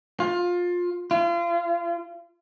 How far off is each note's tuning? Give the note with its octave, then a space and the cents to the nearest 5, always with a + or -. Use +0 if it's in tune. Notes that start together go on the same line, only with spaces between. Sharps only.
F4 +20
F4 -35